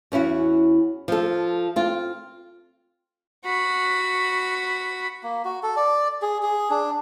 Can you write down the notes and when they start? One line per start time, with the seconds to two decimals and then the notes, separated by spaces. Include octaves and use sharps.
0.12 E2 C#4 E4 F#4
1.08 F3 A4
1.76 C4 F4
3.45 F#4 B5
5.23 A#3
5.45 F#4
5.63 A4
5.77 D5
6.22 G#4
6.43 G#4
6.70 D4